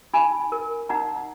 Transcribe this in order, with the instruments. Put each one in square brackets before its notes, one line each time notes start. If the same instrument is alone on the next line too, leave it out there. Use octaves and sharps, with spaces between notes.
[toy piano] D#4 G#5 B5
A#4
D#4 F#5 A#5